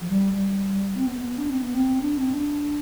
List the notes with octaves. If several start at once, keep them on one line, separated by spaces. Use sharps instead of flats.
F3
G3
G3
C4
B3
B3
D4
C4
B3
C4
D4
C4
D4